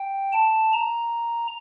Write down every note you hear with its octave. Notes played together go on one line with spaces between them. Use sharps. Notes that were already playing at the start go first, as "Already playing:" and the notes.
Already playing: G5
A5
A#5